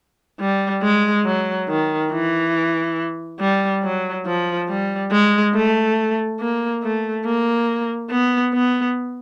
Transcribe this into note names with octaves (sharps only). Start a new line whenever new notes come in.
G3
G#3
F#3
D#3
E3
G3
F#3
F3
G3
G#3
A3
A#3
A3
A#3
B3
B3